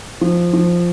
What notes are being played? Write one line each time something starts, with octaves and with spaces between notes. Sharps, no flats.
F3
F3